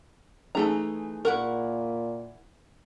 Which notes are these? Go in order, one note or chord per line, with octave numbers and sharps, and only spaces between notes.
E3 A3 D#4 G#4 A#5
A#2 E4 A#4 F#5 C#6